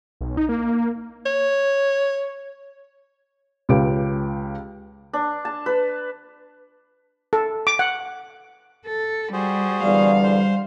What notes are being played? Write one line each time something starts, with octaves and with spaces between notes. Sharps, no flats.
B1
D#4
A#3
C#5
C#2 C#3 G4 B4 D7
D4
A5
B4
A4
D6
F#5
A4
G3 F#4 G#4 C5
E2 D3 G3 D5 F5
C5